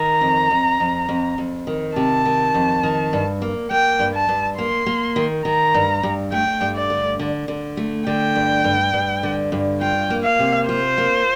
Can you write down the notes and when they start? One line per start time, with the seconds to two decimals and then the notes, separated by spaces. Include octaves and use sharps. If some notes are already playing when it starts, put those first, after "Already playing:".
Already playing: D#3 A#5
0.21 F2
0.51 F2
0.80 F2
1.09 F2
1.38 F2
1.67 D#3
1.96 C3 A5
2.25 D#3
2.54 F2
2.83 D#3
3.13 G2
3.42 A#3
3.70 A#3 G5
3.99 G2
4.14 A5
4.29 G2
4.58 A#3 C6
4.86 A#3
5.16 D#3
5.45 D#3 A#5
5.74 G2
6.03 G2
6.32 A3 G5
6.61 G2
6.76 D5
6.90 D3
7.19 D3
7.48 D3
7.77 A3
8.07 D3 G5
8.36 G2
8.64 G2
8.93 G2
9.23 D3
9.52 G2
9.81 F4 G5
10.10 A#3
10.24 F5
10.39 C3
10.68 F4 C5
10.98 A#3